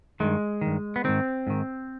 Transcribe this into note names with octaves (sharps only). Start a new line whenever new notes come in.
G2 D#3 G#3
G2 D#3
B3
G#2 D#3 C4
G#2 D#3